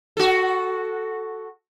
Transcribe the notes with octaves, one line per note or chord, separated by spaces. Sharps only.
F#4 A4